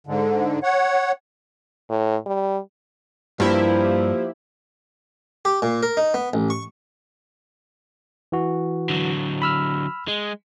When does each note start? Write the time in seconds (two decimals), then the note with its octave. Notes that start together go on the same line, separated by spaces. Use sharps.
0.07 G#2 D3
0.63 C#5 F#5
1.90 A2
2.26 G3
3.40 G2 F3 A#3 E4 G4
5.45 G4
5.62 A#2
5.83 A#4
5.97 D#4
6.14 B3
6.33 A1
6.50 C#6
8.32 E3 F#4
8.89 D3 F#3
9.42 B5 E6 F6
10.08 G#3